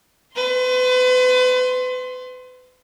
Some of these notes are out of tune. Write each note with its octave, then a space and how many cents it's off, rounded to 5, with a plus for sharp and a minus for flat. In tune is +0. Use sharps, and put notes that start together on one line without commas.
B4 +35 C6 +0